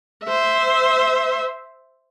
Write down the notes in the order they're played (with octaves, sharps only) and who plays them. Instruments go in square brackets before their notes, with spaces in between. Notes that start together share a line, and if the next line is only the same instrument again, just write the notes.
[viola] C5 E5